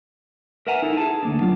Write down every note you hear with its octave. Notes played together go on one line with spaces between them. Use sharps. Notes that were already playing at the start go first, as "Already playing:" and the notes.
A#4 B4 E5 F#5 G#5 A#5
D#4 E4 A4 E5
G#4 A5
D2 A#3 D4
F#3 D4 F4